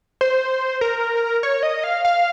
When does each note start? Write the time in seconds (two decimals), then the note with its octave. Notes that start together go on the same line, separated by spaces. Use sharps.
0.21 C5
0.81 A#4
1.43 C#5
1.63 D#5
1.84 F5
2.05 F5